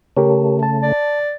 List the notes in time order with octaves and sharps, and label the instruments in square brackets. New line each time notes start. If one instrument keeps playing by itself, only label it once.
[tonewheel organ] C#3 A3 [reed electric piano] G4 A#4 C#5
[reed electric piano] A5
[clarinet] D5